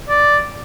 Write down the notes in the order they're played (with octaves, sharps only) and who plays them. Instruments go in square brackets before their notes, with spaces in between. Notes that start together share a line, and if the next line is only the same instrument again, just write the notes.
[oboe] D5